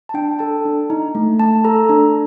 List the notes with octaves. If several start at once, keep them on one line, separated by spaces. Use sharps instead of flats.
A5
D4 G5
A4 A5
D4
D#4
A3
A3 A5
A4 A#5
D4